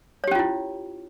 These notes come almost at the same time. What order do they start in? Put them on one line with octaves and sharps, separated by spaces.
C#5 G4 C#4 F4 E4